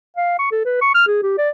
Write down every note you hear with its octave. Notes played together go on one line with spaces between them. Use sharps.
F5
C#6
A4
B4
C#6
F6
G#4
G4
D5